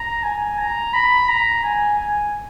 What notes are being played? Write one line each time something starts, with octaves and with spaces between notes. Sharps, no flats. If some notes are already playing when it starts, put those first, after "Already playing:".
Already playing: A#5
G#5
A#5
B5
A#5
G#5
G#5